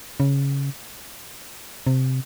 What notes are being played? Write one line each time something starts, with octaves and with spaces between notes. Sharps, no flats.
C#3
C3